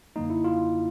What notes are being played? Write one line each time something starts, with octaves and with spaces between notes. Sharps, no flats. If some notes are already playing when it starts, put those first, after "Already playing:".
F#2 D3 F#3 A#3 D#4
E4
F4